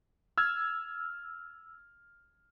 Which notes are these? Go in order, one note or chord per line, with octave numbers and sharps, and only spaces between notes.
E6 F6 G#6